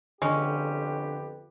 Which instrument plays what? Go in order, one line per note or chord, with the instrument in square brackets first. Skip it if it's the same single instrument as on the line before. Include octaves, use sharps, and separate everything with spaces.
[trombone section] F2 B3 G4 [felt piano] D3 [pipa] G#3 C#4